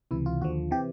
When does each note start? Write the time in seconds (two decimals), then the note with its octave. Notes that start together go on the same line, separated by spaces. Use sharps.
0.11 C#2 C3 E3 E4
0.26 F4
0.41 D#2 D3 F3 F#4
0.71 C3 E3 G4